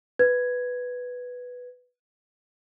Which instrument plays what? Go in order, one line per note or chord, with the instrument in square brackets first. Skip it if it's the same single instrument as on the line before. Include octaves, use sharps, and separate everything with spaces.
[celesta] B4 G#6